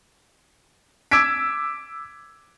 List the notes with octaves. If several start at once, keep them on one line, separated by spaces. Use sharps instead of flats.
D6 E6 G#6 B6 D7